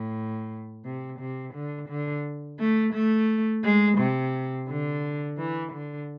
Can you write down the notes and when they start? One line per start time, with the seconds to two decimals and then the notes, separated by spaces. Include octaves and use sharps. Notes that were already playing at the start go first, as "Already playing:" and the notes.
Already playing: A2
0.85 C3
1.19 C3
1.54 D3
1.89 D3
2.59 A3
2.94 A3
3.63 G#3
3.98 C3
4.68 D3
5.37 E3
5.73 D3